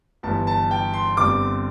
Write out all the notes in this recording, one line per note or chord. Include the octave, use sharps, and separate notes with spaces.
G1 G2 E3 A5
A5
G5
C6
G1 G2 D3 C4 D6